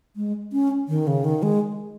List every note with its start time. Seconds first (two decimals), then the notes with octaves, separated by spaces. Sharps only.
0.16 G#3
0.53 C#4
0.88 D#3
1.07 C#3
1.24 D#3
1.43 G#3